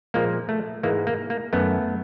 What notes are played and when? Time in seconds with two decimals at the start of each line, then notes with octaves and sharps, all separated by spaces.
0.14 A#2 F3 G#3 A#3
0.49 A3
0.83 G#2 E3 G#3 A#3
1.07 A#3
1.30 A#3
1.53 F#2 D#3 F#3 A3 B3